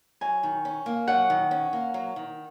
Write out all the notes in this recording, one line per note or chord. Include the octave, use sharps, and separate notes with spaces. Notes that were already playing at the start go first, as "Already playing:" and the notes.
F#3 G#5
D#3
C#4
A#3
F#3 F#5
D#3
C#4
A#3
F#3
D#3